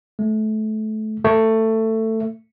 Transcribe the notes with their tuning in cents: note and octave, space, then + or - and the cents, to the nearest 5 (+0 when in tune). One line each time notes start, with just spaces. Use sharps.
A3 -25
A3 +15